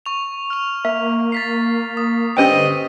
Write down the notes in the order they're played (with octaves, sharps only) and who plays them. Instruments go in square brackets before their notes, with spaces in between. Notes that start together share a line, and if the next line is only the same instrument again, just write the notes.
[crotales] C#6 F7
F6 F7
[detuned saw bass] A#3 [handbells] E5
[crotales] A6 B6 C7
D#6
[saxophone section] G2 C4 D#5 [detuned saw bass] D3 [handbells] C#4 B4 G5